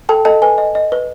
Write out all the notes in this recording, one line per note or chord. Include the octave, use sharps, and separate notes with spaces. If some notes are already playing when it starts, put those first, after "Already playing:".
A4 G5 A5
A4 D#5 A5
B4 G#5
D#5
D#5
B4